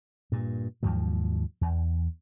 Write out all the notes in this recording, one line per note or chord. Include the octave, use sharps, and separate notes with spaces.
G2 A#2
D#2 G#2 F3 F#3
E2